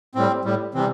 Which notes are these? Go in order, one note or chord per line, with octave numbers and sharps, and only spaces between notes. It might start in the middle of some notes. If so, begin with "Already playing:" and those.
A2 G3 C4
A2 G3
C3 E3 G3 C4